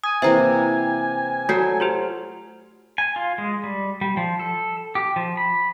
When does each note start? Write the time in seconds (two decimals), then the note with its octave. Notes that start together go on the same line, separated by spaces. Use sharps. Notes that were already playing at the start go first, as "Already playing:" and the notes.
0.04 G#5 D#6
0.22 C3 E3 A#3 E5 G5 A#5
1.49 F#3 A3 F#4 A4
1.80 F4 G4 C5
2.98 G#5
3.16 F4
3.38 G#3
3.64 G3
4.01 G3
4.17 F3
4.40 A4
4.95 G4
5.16 F3
5.37 B5